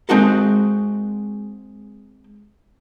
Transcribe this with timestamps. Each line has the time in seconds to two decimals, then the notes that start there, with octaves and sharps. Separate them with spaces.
0.09 G#3 C4 D#4 F#4 A4 A#4